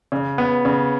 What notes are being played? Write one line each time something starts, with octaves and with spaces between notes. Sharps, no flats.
C#3
B3
C#3